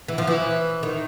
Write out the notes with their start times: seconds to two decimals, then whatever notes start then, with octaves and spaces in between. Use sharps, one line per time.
0.08 E3
0.18 F3
0.27 E3
0.83 D#3